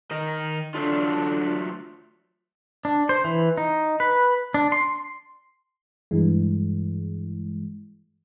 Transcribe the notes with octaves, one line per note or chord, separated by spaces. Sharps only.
D#3 D#4 D#5
D3 F#3 A3 D4 F4
D4
C5
E3
D#4
B4
D4
C6
G2 E3 G#3